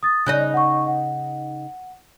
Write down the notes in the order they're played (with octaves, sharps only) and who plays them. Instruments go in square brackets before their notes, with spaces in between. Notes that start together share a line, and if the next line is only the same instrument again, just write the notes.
[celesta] D#6 A6
[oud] C#3 D#4 D#5 [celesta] F#6
[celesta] F#5 C#6
F#5